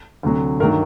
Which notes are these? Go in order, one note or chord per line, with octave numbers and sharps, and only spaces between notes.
D2 C3 F#3
G2 D#3 F#3 A#4